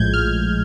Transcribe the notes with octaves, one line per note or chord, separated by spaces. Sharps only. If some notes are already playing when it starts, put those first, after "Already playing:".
Already playing: A#1 A2 F3 G#3 G6 G#6
F6